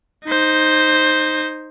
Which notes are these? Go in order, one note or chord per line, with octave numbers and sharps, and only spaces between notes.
D#4 C5